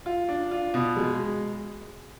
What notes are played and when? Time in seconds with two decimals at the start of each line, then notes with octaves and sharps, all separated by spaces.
0.06 F4
0.29 D4
0.51 F4
0.74 B2
0.96 G#3